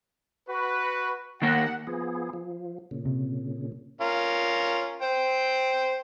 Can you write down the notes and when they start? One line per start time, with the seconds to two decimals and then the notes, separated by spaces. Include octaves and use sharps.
0.49 F#4 B4
1.42 D#3 A#3 A#4 F#5
1.87 F3 B3 G#4
2.33 F3
2.91 A#2 C#3
3.05 C3
4.01 C#4 F4 A#4
5.02 C5 G5